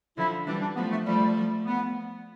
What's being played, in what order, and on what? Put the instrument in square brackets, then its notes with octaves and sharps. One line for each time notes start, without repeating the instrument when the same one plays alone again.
[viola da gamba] D3 F3 [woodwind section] E4
[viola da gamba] E3 G3 [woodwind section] D4
[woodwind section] D4
[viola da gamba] F3 A3 [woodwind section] B3
[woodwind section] A3
[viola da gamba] F3 A3 [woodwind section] G3
[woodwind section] B3